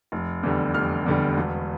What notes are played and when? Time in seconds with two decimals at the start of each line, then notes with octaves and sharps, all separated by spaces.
0.12 F1
0.43 E2 D3 G3
0.74 F1 F6
1.06 E2 D3 G3
1.37 E1